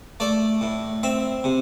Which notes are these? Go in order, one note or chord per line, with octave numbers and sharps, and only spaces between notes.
A3 D5
A2
C4 E5
C3